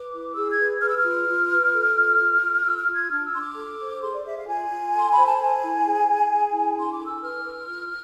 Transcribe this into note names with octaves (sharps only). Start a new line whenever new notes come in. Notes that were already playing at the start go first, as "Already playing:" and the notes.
Already playing: B4 D6
E4
G#4 E6
G#6
B4
B4 F6
E6
F6
F4
F4
B4
A4
F4
F4
F4
F4 E6
F6
F4
G#6
D4 F6
E6
D4 C6
D6
A4
C5
G#4 C6
D5
G#4 E5
F5
F4 G#5
F4
A4 C6
B5
C5
A5
A4 G#5
E4
G#4
G#4
G#4
E4
D4 C6
D6
A4
E6
B4 F6
B4
F4